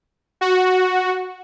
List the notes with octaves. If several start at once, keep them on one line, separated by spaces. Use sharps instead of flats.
F#4